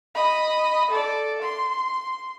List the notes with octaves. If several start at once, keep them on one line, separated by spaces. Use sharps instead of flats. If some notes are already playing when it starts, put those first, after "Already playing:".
D#5 B5
A4 D5
C6